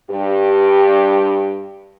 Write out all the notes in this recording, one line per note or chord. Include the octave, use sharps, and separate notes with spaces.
G2 G4